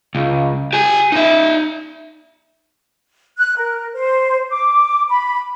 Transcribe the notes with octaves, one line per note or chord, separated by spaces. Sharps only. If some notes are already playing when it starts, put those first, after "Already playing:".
C#2
G4 G#5
D#4 E5
F#6
A#4
C5
D6
B5